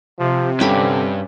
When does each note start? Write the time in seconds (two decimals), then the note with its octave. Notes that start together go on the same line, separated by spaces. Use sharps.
0.19 C3 F3
0.60 G2 D3 C#4 G4 B5